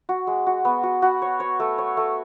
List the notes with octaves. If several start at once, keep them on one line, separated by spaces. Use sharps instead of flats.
F#4
G#3
F#4
B3
F#4
F#4
C#5
C#5
A3
C#5
A3